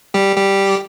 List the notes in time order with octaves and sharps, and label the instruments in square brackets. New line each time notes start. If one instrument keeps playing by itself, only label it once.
[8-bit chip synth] G3 G4
G3 G4